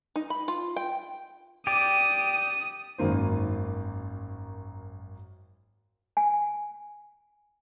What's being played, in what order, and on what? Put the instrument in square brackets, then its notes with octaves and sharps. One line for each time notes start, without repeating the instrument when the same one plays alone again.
[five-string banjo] D#4
B5
F4
G5
[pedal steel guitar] G4 D5 [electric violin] D#6
[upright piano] G#1 F#2 D#3 A#3 C5
[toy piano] G#5